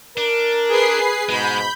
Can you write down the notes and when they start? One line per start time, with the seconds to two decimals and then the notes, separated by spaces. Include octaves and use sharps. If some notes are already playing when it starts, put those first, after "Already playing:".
0.17 D4 A#4
0.68 G#4 B4 C7
1.29 G#2 B2 G#3 B5 G6